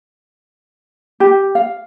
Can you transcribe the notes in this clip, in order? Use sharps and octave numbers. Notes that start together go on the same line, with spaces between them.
G4
F5